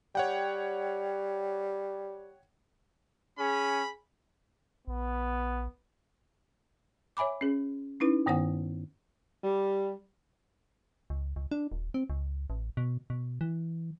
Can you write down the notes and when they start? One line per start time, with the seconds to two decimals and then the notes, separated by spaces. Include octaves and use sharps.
0.15 G3 C#5 F#5 G5
3.39 C#4 G#4 B5
4.87 A#1 B3
7.17 C#5 E5 G#5 B5 D6
7.41 C#4 G#4
8.00 C#4 D#4 E4 B4
8.26 G2 D#3 B3 C5 F#5 D#6
9.44 G3
11.10 C#2
11.36 C#2
11.51 D4
11.72 D#1
11.94 C4
12.10 C#2
12.50 A1
12.77 B2
13.10 B2
13.41 E3